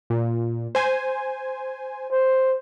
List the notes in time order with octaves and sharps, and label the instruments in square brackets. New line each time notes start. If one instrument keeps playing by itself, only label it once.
[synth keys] A#2
C5 G#5
[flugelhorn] C5